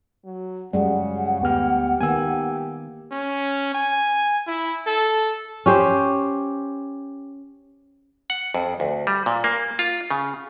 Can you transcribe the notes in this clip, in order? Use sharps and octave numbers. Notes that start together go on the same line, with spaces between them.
F#3
F#2 C#3 G3 G#3 F#5
D2 B3 G4 F6
D#3 A#3 B3 G#5 E6
C#4
G#5
E4
A4
C#4 G4 C5
F#5
F2
D2
G3
A#2
A#3
F4
C#3